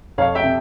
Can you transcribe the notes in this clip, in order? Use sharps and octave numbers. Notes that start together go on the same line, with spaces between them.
F2 C#5 F5
E5 G5
C3